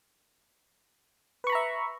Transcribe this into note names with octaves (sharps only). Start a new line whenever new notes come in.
B4 E5 A#5 B5 C#6